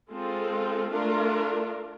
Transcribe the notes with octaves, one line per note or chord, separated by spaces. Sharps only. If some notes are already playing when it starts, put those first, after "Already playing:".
G#3 C4 F4 A4
A3 D4 F4 A#4